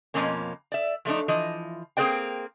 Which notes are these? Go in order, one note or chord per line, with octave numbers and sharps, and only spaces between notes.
F2 B2 F3 A#3 C#4
D5 E5
F3 A3 D4 D#4
E3 F3 D#5
A#3 C4 G#4 B4 D5 G5